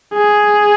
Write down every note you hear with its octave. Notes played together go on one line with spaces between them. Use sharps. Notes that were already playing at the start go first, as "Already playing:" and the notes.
G#4